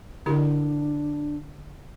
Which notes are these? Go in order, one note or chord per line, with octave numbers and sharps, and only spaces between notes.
D3 D4 E4 G4